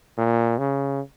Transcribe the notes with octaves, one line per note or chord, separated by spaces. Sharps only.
A#2
C#3